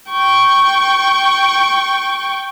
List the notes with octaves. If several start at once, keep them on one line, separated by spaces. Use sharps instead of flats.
G5 C#6